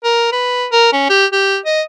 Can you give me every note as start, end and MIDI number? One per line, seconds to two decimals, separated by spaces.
0.04 0.28 70
0.32 0.66 71
0.72 0.89 70
0.92 1.05 61
1.09 1.26 67
1.32 1.58 67
1.66 1.82 75